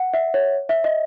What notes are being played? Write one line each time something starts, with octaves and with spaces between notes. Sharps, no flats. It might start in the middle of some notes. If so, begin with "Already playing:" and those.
Already playing: F#5
E5
C#5
E5
D#5